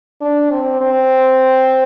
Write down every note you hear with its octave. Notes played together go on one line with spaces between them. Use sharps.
D4
C4
C4